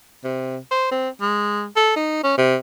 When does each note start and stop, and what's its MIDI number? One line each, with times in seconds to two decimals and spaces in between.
0.24 0.57 48
0.71 0.89 72
0.91 1.09 60
1.21 1.66 56
1.76 1.93 69
1.96 2.22 63
2.24 2.34 61
2.38 2.56 48